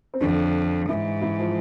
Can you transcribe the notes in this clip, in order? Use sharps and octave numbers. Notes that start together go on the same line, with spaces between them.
C4
F2 D3 D4
G#2 E3 E4
E3 E4
F3